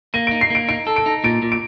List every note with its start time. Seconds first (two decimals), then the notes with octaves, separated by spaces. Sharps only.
0.14 A#3 D#7
0.27 D#4 D7
0.41 C7
0.50 A#3 D7
0.69 D#4 D7
0.87 A4
0.96 D7
1.06 D#4
1.24 A#2 D7
1.42 A#2
1.52 D7